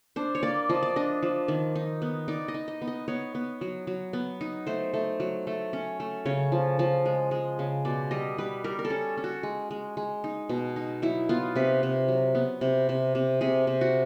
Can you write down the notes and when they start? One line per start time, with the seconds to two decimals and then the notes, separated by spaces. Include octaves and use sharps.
0.16 D4 C5
0.35 C#5
0.43 A#3 D5
0.69 F3 D#5
0.83 D5
0.96 D4 D#5
1.22 F3
1.48 D#3
1.75 D#4
2.02 B3
2.28 D#4 D5
2.48 D#5
2.54 D#4
2.68 D#5
2.82 B3
2.87 D#5
3.08 B3 C#5
3.35 B3
3.61 F#3
3.87 F#3
4.13 B3
4.41 D#4
4.66 A3 C5
4.94 A3
5.20 F#3
5.47 A3
5.73 C#4
6.00 A3
6.25 C#3 C#5
6.52 F3
6.79 F3
7.06 G#3
7.31 G#3
7.59 C#3
7.85 B2 D5
8.11 G3 D#5
8.38 G3 B4
8.64 G3 A#4
8.79 A#4
8.85 A4
8.90 C#4
9.17 C#4
9.24 F#4
9.43 G#3
9.71 G#3
9.97 G#3
10.24 D#4
10.49 B2
10.76 D#4
11.02 F#3 E4
11.29 B3 F4
11.55 C3 B4
11.83 C3
12.08 F#3
12.35 B3
12.61 C3
12.89 C3
13.15 C3
13.41 C3 G#4
13.67 C3
13.81 F#4